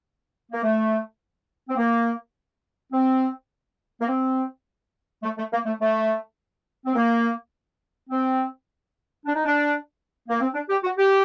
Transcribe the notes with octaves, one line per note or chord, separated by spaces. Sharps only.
A#3
A3
C4
A#3
C4
A#3
C4
A3
A3
A#3
A3
A3
C4
A#3
C4
D4
D#4
D4
A#3
C4
D4
G4
F#4
G4